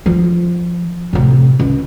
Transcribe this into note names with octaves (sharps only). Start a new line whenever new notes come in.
F3
A2 C3
C#2